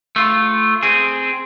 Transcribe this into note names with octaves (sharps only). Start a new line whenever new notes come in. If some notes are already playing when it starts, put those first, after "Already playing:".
A3 F4
C4 G#4